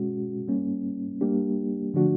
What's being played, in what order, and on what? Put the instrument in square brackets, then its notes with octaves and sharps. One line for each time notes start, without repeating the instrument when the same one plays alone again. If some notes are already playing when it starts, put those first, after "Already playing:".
Already playing: [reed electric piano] B2 G#3 C#4 F#4
G3 A#3 C#4
G3 A#3 D4 G4
D3 F3 A3 D4 F#4